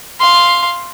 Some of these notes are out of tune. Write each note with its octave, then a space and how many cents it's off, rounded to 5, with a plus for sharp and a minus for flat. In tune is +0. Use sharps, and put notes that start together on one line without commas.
F5 +0 C6 +5